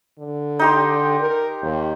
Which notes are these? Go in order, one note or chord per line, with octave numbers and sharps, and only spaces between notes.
D3
D#4 G4 C6
A#4
D#2